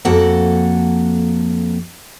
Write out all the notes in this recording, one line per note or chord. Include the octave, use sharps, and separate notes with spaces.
F2 A#3 F#4 A4 F#5